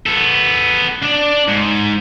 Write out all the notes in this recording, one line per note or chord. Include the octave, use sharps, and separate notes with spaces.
B3 A4
D4 D5
G#2